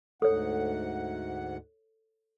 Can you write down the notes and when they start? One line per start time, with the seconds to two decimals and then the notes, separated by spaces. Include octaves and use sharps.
0.22 D2 G#2 A4 C#5 F#5